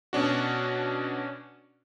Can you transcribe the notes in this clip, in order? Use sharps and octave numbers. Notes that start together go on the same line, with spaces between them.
B2 C#4 D4 F#4